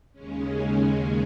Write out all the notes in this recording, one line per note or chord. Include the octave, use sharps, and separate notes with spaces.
D#2 C#3 G#3 C#4